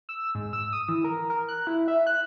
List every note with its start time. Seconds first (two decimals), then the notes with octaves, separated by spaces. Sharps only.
0.09 E6
0.35 G#2
0.53 E6
0.73 D#6
0.89 E3
1.04 A#4
1.30 A#4
1.49 F#6
1.67 E4
1.88 E5
2.07 F#6